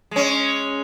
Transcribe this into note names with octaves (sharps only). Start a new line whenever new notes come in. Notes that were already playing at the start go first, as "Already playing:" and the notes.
G#3 C#4